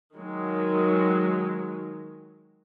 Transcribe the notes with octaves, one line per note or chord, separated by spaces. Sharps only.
D#3 F#3 G#3